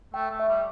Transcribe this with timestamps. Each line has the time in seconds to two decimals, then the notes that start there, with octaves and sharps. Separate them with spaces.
0.14 A3 G5
0.31 A3
0.40 E5
0.49 G3